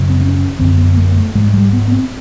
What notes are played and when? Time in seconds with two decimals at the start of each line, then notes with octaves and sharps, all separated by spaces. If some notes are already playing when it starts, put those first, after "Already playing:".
Already playing: F#2 C#3
0.10 C4
0.21 C#4
0.59 F#2 D3 C4
0.78 B3
0.97 A#3
1.16 A3
1.35 G#2 G#3
1.54 G3
1.73 B3
1.92 C4